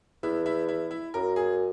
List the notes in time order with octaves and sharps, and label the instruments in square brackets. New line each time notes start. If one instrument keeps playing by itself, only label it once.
[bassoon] E2 [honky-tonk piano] E4
[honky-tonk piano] E4
E4
E4
[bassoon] F#2 [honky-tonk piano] A#4
[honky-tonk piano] G#4